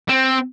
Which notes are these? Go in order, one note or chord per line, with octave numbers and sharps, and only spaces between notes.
C4